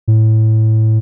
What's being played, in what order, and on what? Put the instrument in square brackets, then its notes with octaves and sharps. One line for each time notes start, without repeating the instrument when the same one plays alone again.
[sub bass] A2